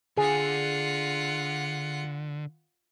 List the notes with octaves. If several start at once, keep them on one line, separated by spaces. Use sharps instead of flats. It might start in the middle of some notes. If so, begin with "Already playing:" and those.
D3 F4 G#4 F#5